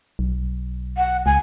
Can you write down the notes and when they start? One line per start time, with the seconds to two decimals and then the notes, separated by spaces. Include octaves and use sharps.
0.19 B1
0.97 F#5
1.26 C#2 G#5